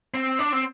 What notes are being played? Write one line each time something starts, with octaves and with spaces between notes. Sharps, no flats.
C4
D4
C4